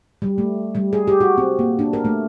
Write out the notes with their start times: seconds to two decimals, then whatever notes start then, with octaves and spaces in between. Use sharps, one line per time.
0.22 G3
0.38 A3
0.75 G3
0.93 G#4
1.08 G4
1.20 F#4
1.38 C4
1.59 A#3
1.79 D4
1.93 A#4
2.05 A3